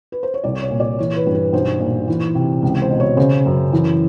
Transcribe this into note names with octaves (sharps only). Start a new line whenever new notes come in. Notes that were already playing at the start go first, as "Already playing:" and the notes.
B4
C5
C#5
C2 D5
C#5
A#2
D5
E3 C#5
B4
G2
B4
B1 C5
A#2
E3
C3
C#2
C5
B2
C#5
C#3 C5
F#2
E3